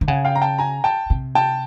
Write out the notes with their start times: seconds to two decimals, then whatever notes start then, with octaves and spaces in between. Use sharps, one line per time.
0.01 D3
0.08 C#3 F#5 G#5
0.25 F5 G5
0.36 A#5
0.42 G5 A5
0.58 G#5 A#5
0.84 G5 A5
1.10 C3
1.35 G5 A5